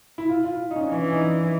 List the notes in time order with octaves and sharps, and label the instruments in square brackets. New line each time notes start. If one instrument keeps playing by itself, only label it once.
[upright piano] E4
F4
F4
D#4
C#4
D4
[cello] E3 [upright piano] C#4
[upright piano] D4
D#4